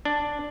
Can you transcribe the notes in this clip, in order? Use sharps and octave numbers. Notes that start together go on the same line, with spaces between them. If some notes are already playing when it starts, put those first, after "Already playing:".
D4